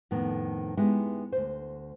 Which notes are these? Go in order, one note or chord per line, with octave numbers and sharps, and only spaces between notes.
F2 A2 D#3 B3
G#3 B3 D#4 E4 G4
D2 C5